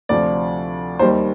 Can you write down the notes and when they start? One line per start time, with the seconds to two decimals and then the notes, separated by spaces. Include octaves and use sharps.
0.09 D2 C3 F3 D5
0.99 D#2 D#3 G3 C5